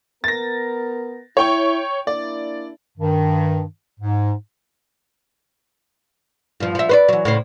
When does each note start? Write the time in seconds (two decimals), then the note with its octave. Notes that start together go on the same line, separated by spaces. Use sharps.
0.24 B3 A#4 A6 A#6
1.37 E4 C#5 G5 C#6
2.07 A#3 D4 E4 D5
2.98 G2 D#3
4.00 G#2
6.60 G2 F3
6.75 F3 E5
6.89 B4 C5 D5
7.09 E3 F#3
7.25 A2 C#3 C5